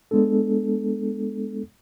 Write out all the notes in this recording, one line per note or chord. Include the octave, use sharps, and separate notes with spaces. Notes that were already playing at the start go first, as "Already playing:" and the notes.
G#3 B3 D4 A4